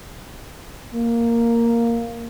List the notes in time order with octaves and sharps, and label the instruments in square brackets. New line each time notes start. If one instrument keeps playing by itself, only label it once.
[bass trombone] A#3